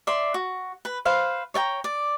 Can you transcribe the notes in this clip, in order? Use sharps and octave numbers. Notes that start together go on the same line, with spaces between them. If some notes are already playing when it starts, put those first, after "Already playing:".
D5 E5 C6
F#4
B4
B4 C5 F5
C#5 D5 G5 A#5
D5